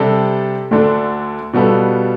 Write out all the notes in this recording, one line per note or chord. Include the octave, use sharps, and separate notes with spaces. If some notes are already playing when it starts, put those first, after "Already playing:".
Already playing: C3 G3 D4 A4
D2 D3 A3 D4
B2 G3 B3 F4 A4